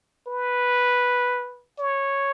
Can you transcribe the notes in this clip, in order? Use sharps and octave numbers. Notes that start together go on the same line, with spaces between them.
B4
C#5